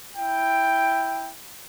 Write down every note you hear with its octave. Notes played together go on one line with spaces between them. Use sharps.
E4 G5